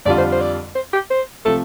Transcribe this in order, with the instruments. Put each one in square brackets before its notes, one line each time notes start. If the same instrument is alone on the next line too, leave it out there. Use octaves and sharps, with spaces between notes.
[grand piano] F2 D3 G3 D4 F4 [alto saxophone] D5
[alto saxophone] C5
C5
D5
C5
G4
C5
[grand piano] C3 F3 A3 [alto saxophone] A4